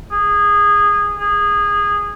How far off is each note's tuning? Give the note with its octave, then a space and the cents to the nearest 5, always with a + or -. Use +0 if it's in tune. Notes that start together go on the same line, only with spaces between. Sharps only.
G#4 -20
G#4 -20